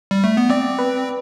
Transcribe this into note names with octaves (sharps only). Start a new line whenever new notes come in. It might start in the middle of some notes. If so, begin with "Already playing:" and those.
G3
A3
B3
C4 D5
B4